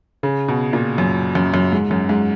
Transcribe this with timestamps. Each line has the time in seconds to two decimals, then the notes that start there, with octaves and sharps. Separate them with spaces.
0.23 C#3
0.48 B2
0.73 A#2
0.98 F#2
1.35 F#2
1.54 F#2
1.72 G#2
1.91 F#2
2.09 G#2